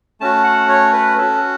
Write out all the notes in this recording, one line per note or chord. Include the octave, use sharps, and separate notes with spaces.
A3 C#4 F#4 A5
F#5
C#5
B4
C#4 F#4 A4